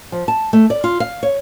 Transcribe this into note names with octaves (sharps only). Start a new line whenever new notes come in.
F3
A5
A3
D5
F4
F5
C#5